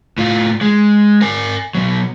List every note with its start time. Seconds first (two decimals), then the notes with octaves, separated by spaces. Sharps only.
0.18 A2 F4
0.61 G#3
1.21 A#4 G#5
1.75 B2 F#3